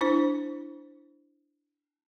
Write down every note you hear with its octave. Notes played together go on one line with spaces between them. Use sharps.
D4 E4 C5